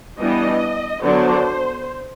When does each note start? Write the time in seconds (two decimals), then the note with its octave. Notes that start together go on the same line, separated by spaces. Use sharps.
0.20 E3 G3 B3 D4 D#5
1.02 D3 F#3 B3 D4 C5